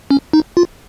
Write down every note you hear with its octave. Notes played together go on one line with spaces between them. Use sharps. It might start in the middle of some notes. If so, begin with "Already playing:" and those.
C#4
D#4
F4